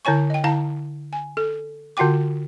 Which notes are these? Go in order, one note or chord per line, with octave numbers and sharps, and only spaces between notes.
D3 E4 C#5 G#5 C#6
D#5 G5
D3 E4 F5 A5 A#5
G#5
A4
D3 F4 F#4 F#5 G5 D6